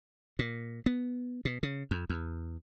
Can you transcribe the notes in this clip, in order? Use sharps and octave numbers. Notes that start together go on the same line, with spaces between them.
A#2
B3
B2
C#3
F2
E2